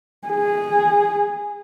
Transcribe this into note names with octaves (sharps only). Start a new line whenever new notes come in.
G#4